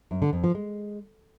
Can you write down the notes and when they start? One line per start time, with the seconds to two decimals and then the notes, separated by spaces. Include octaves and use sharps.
0.11 F#2
0.22 D3
0.33 F2
0.44 F3
0.55 G#3